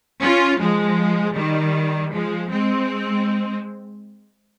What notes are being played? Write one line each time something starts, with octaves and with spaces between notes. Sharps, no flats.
C#4 F4
F3 G#3
D#3 G3
F3 G#3
G#3 C4